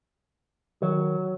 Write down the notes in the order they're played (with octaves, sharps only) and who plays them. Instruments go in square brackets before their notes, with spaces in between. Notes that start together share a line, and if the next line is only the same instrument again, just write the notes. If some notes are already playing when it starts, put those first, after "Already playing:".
[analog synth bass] D#3 [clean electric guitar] F#3